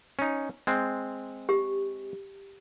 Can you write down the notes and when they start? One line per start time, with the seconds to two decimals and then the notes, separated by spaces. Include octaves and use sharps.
0.19 C#4 D#4
0.67 G#3 C4
1.49 G4